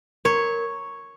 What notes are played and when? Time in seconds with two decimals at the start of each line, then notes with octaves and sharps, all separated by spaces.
0.25 A#4 C#5